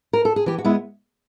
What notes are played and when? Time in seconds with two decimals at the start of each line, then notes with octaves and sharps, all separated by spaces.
0.13 A#4
0.25 A4
0.36 G#4
0.46 E3 G4
0.58 F#4
0.65 G#3 B3 E4